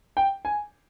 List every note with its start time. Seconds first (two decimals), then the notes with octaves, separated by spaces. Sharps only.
0.17 G5
0.45 G#5